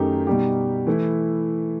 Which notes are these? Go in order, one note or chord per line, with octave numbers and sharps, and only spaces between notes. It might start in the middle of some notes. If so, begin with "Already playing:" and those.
Already playing: F#2 D#3 A3 D#4 G4
B2 G3 D#4 G4
E3 A3 E4